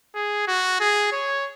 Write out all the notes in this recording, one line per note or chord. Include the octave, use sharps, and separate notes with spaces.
G#4
F#4
G#4
C#5